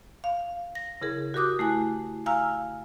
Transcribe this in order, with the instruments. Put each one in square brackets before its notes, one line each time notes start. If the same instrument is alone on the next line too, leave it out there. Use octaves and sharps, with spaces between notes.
[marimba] F5
A#6
C#3 E4 G#4 A#4
F#4 G4 A#4 D6 D#6 F#6
A3 E4 G#5
F5 G#5 A#5 E6 F6